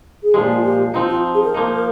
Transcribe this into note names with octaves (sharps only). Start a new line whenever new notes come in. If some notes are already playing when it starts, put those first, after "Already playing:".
G#4
A#2 F3 G#3 G4
F4
G4
F3 C4 D#4 F4
F4
G#4
A#4
F3 A#3 D#4
A#4